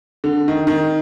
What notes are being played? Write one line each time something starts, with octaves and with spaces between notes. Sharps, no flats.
D3
D#3
D#3